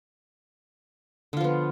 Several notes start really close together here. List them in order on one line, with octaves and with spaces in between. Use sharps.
D3 F4 F3 B3